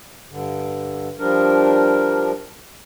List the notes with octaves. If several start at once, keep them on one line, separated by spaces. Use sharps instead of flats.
G2 D3
F3 G3 D4 A#4